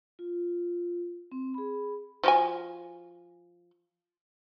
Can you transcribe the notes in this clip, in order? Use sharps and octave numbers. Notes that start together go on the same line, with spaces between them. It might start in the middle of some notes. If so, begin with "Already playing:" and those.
F4
C4
G#4 B5
F3 F#4 G#5